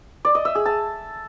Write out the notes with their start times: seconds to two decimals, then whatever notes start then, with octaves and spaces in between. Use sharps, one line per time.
0.25 D5
0.35 D#5
0.45 E5
0.55 G#4
0.66 A5